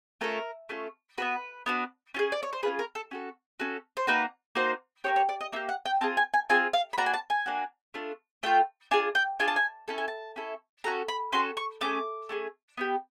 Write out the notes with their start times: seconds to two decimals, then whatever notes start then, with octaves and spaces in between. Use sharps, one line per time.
0.21 A3 C#4 F4 A4 A#4
0.69 A3 C#4 F4 A4
1.18 B3 D4 F#4 B4
1.66 B3 D4 F#4
2.14 C#4 F4
2.19 G#4
2.32 D5
2.43 C#5
2.53 C5
2.63 C#4 F4 G#4 B4
2.79 A#4
2.95 A4
3.11 C#4 F#4 A4
3.60 C#4 F#4 A4
3.97 C5
4.07 A#3 D#4 F#4 B4
4.55 A#3 D#4 F#4 C5
5.04 A#3 D4 G4 C#5
5.16 C#5
5.29 D5
5.41 D#5
5.52 A#3 D4 G4 E5
5.69 F#5
5.85 G5
6.01 C4 F4 G#4 A5
6.17 G#5
6.34 G#5
6.49 C4 F4 G#4 G#5
6.73 F5
6.93 B5
6.98 A#3 D4 F#4 A#5
7.06 G#5
7.14 A5
7.30 G#5
7.46 A#3 D4 F#4
7.94 A3 D4 F4
8.43 A3 D4 F4 G5
8.91 D4 F4 G#4 G#5
9.15 G5
9.39 D4 F4 G#4 G#5
9.48 A5
9.56 G#5
9.88 C#4 E4 A4 A5
9.98 G#5
10.08 A5
10.36 C#4 E4 A4
10.84 C#4 F#4 A4 A#5
11.08 B5
11.32 C#4 F#4 A4 C6
11.57 C#6
11.81 A3 C#4 G#4 D6
12.29 A3 C#4 F4 G#4
12.77 B3 E4 G4